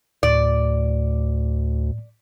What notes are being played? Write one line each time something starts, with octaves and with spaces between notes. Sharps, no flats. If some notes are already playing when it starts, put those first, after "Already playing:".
D2 A2 D5